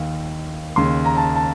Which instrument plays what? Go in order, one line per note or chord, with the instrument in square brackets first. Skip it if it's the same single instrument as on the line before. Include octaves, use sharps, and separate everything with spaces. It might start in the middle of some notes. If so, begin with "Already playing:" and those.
Already playing: [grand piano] D#2 D#3 F5
D#2 C#3 C6
A#5
A5
A5